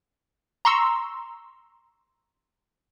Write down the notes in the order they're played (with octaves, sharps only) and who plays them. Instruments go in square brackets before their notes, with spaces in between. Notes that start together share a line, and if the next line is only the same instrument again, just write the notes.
[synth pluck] A#5 C6 C#6 E6